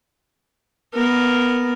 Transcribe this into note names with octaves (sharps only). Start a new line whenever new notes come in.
B3 A#4